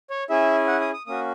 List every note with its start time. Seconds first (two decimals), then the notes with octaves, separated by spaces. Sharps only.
0.10 C#5
0.30 C#4 E4 G#4 E5
0.68 F#5
0.81 D#6
0.94 D#6
1.07 A#3 C#4 F#4 D#6